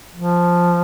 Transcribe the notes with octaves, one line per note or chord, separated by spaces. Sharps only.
F3